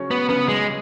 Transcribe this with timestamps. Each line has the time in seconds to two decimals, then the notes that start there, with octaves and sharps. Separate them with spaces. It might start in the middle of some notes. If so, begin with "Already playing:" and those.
Already playing: C#3 F#3 C#4
0.11 B3
0.29 C#3 B3
0.48 G#3